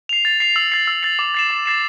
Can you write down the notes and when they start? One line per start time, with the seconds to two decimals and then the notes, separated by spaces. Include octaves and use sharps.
0.09 C7 F7
0.25 A6
0.40 C7 F7
0.56 E6
0.72 A6 C7
0.87 E6
1.03 A6 C7
1.19 D6
1.35 A6 C7 E7
1.50 D6
1.66 A6 C7 E7